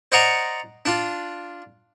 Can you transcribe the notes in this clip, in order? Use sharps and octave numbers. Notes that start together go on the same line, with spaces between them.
C5 D5 D#5 F#5 A#5 C#6
D4 F4